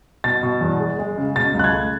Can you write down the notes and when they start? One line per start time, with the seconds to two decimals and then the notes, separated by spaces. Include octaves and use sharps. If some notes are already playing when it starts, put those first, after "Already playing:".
0.24 B2 A6
0.43 B2
0.61 E2
0.80 G#3
0.99 G#3
1.18 C#3
1.36 B2 A6
1.54 C#2
1.59 F#6
1.64 G#6
1.73 A3